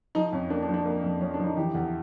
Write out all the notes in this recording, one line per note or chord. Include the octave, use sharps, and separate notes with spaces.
F3 D#4
F2 C#4
A#3 D4
D4
F3
D4
A#3
F2
F3 C#4
D4
F3
D#4
E3 G4
E2